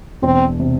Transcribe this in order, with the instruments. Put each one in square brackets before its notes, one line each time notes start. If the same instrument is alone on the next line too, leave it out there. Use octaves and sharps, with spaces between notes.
[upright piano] E1 [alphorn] C4
[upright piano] C3